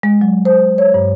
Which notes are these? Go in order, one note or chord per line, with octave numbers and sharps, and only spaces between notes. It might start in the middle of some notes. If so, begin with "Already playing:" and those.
G#3
F#3
C5
C#5
G2